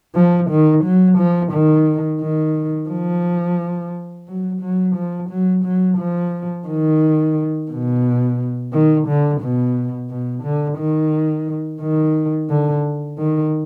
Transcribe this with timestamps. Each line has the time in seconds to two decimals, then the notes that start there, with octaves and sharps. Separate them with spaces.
0.16 F3
0.50 D#3
0.84 F#3
1.18 F3
1.53 D#3
2.22 D#3
2.90 F3
4.28 F#3
4.62 F#3
4.96 F3
5.30 F#3
5.65 F#3
5.98 F3
6.67 D#3
7.71 B2
8.73 D#3
9.07 D3
9.41 B2
10.10 B2
10.44 D3
10.78 D#3
11.81 D#3
12.50 D3
13.18 D#3